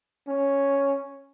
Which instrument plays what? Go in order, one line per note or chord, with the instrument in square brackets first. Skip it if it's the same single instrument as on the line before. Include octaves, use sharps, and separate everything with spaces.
[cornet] C#4